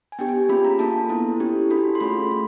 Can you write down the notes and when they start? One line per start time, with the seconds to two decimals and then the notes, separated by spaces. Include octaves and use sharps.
0.12 G#5
0.19 B3 D4 G4 G5
0.28 G#5
0.49 A#3 C#4 F4 G#4 B5
0.65 A#5
0.79 A#3 D4 F4 A4 A5
1.09 B3 E4 A4
1.40 C#4 E4 G4
1.70 D4 F#4 A4 B5
1.95 C6
2.00 A3 C#4 F4 G#4 B5
2.31 A3